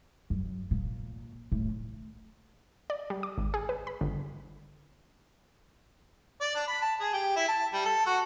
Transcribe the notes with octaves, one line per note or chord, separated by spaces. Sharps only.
F#2
A#2
A2
D5
G3
D6
G#1
G#4
B4
B5
G1
D5
D4
B5
A5
G#4
G4
E4
A5
G3
A4
F#4